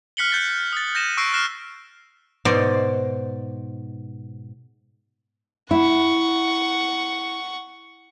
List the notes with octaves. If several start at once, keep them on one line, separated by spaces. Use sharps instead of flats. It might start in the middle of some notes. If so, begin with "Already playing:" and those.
F6 F#6 B6 C#7 F#7 G7
F#6 G6 A6
D#6 A6
G6 A#6 D#7 E7
C#6 E6 F#6 A#6 C7 D7
F6 F#6 A#6 C7 E7
G#2 B2 C5 D5 D#5 C6
E4 F#5 C#6